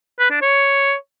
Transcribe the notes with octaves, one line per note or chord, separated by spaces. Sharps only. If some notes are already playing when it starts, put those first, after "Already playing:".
B4
D4
C#5